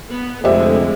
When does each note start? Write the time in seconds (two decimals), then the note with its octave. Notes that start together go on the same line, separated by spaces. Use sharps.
0.10 B3
0.44 F1 F2 D3 G#3 G4 C5 D#5 E5